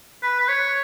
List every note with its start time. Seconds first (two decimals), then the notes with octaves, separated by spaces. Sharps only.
0.23 B4
0.40 B4
0.49 C#5